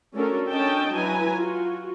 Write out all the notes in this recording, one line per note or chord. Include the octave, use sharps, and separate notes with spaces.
A3 C#4 D4 F#4 A4 A#4
C#4 D4 A4 D#5 G5 A5
F#3 E4 B4 G#5 A#5
F4 F#4